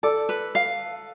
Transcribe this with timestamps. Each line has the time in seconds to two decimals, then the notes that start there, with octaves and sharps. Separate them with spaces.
0.03 A4 D5
0.29 B4
0.55 F5